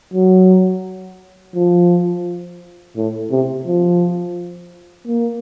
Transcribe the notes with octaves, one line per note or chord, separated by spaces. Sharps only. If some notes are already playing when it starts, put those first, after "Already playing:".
F#3
F3
A2
C3
F3
A#3